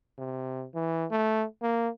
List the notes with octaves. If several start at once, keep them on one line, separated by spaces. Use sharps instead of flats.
C3
E3
A3
A#3